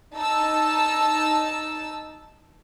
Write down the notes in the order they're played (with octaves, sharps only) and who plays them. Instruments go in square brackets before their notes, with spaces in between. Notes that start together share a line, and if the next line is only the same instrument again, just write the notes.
[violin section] D#4 A5 E6